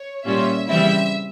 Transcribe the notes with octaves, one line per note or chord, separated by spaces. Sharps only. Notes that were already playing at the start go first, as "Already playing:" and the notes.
Already playing: C#5
A#2 G3 C#4 F4 E5
C#3 E3 G3 C4 E4 E5